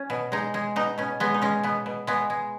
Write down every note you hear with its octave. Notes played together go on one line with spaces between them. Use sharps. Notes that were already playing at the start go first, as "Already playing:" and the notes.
Already playing: C#4
B2
G#3 D#4
G#3
B2 D#4
B2 C#4
G#3 B3
D#4
G#3 C#4
B2 B3
B2
G#3 B3
G#3